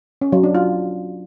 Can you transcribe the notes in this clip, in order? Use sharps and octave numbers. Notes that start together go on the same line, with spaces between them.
C#4
F#3
D4
F4